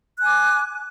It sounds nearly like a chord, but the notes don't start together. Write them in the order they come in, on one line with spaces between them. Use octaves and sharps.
F#6 G#5 D6